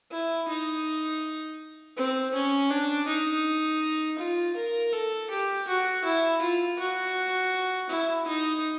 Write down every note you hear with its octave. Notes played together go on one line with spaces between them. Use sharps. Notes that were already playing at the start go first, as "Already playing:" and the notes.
E4
D#4
C4
C#4
D4
D#4
F4
A#4
A4
G4
F#4
E4
F4
F#4
E4
D#4